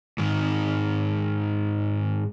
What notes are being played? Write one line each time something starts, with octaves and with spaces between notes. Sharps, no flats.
G#2 D#3